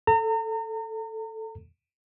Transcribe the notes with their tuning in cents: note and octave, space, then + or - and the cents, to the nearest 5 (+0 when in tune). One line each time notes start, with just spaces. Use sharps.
A4 +0 A#5 -35